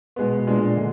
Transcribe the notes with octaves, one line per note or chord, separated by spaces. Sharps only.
B2 G#3 B3
A#2 G#3 D4
D3